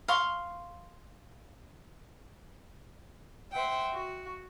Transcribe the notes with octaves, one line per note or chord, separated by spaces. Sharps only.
F5 C6 C#6
C5 E5 F#5 G5
F#4